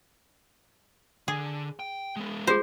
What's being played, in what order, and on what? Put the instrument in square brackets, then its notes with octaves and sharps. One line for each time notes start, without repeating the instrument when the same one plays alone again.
[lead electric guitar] D3 [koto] G#4
[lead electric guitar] G5
G#3 B3
[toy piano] F4 G#4 [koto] C5